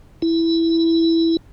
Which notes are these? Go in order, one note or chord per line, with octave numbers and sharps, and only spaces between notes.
E4